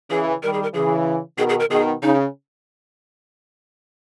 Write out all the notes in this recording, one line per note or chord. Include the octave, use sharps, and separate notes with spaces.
C#3 E3 G#4
D#3 G3 A#4
G#4
A#4
C#3 E3 G#4
B2 D#3 G#4
G#4
A#4
B2 D#3 G#4
C#3 D#4